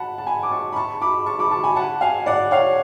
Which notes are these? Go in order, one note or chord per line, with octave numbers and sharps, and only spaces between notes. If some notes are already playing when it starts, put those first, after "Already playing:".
Already playing: F#5 A5 B5
A5
G#5 B5
D6
A5 C#6
B5
A5 C#6
B5 D6
A5 C#6
B5 D6
A5 C#6
G#5 B5
F#5 A5
F5 G#5
D5 F#5
C#5 F5